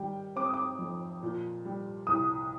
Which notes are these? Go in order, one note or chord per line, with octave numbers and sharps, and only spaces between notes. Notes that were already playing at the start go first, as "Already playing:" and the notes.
Already playing: D#3 G3 G5
C4 D6
D#6
D6
F2
A#2
G3
C2 D#6